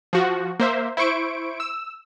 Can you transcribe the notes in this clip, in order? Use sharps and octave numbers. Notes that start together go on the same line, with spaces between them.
F3 F#4
A#3 C5 E5
E4 C5 C#6 D7
E6